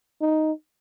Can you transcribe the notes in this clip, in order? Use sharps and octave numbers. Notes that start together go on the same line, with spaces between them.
D#4